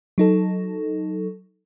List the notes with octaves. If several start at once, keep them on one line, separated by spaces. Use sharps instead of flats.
F#3 D#4 A4